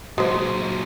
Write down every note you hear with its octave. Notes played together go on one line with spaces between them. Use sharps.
A#2 F#3 G#3 C5